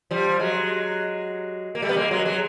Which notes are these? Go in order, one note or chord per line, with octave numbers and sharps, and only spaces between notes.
F3 G3
F#3 G#3
A#3
G3 A3
B3
G#3 A#3
F#3 G#3
F#3 G#3